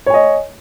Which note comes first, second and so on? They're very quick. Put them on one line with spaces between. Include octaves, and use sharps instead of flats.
C#5 G#5 D#5